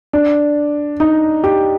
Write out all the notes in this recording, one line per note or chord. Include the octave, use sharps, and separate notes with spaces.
D4
D#4
G4